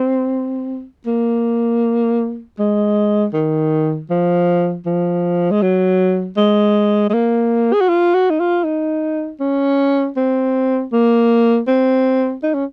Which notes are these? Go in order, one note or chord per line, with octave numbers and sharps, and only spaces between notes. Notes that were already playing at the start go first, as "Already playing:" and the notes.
Already playing: C4
A#3
G#3
D#3
F3
F3
G#3
F#3
G#3
G#3
A#3
G#4
F#4
F4
F#4
D#4
F4
D#4
C#4
C4
A#3
C4
D#4
C#4